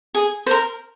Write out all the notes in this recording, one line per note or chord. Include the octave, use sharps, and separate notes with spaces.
G#4
C5
A#4